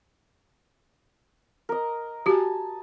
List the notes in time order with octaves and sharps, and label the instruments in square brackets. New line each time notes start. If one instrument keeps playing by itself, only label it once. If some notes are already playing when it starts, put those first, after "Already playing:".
[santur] A#4 D#5
[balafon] F#4 G4 [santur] G#5 A5